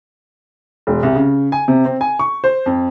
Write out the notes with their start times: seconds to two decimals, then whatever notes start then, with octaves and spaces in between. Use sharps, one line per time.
0.87 E1
1.03 C2
1.15 C#3
1.52 G#5
1.68 C3
1.85 C4
2.01 G#5
2.19 C#6
2.44 C5
2.66 F2